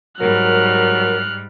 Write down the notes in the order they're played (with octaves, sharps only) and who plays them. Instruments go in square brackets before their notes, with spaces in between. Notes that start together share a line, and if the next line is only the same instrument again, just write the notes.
[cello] G#2 G3 [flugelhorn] F#3 [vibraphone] A#4 [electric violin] F6 F#6